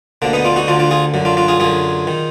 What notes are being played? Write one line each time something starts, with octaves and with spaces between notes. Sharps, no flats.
D2 D3 A#3 D4
B3 D#4
D4 F4
D#4 F#4
D2 D3 D4 F4
D4 F4
F4 G#4
F#2 D3
D4 F4
D4 F4
F4 G#4
F#2 D3 F4 G#4
D#3